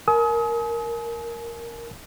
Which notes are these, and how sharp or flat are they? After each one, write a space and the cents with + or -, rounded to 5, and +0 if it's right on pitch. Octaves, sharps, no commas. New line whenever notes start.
A#4 +0 G#5 +40 D#6 +35